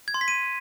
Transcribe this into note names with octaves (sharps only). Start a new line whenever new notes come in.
G#6
C6
B6
D#7